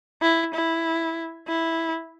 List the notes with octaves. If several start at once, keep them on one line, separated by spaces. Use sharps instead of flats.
E4
E4
E4